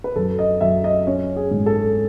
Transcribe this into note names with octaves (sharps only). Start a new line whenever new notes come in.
B4
F#2 A4
D#5
F#2 E5
D#5
C#4 C#5
G#4
G#2
A4